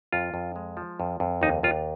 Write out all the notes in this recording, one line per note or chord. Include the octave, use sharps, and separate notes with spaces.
F2 F4
F2
G#3
F3
F2
F2
D#2 D#4
D#2 F4